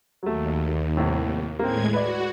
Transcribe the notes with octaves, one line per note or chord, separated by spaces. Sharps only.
D#2 F#3 A3
C2 A2
A2 G#3 A#3 C4 G#6
F#4 B4 D5